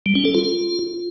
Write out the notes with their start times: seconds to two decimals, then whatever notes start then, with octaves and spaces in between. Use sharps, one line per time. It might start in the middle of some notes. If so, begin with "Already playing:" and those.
0.06 G3
0.15 C#4
0.25 A4
0.35 F4